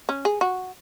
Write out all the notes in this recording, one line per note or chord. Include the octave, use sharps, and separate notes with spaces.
C#4
G#4
F#4